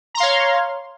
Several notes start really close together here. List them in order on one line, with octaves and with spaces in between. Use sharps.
A#5 C6 F5 C#5